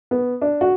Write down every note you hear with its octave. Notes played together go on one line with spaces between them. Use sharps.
B3
D4
F#4